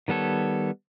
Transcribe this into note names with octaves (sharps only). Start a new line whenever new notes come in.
D#3 G3 B3 A4 C#5